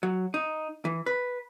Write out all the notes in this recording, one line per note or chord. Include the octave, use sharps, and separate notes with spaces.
F#3
D#4
E3
B4